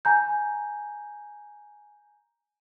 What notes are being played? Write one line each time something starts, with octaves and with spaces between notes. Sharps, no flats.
G#5 A#5 G6